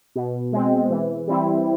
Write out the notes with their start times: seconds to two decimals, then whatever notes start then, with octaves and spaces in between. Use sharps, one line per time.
0.16 B2
0.53 G#3 C4
0.90 E3
1.28 G3 C4 E4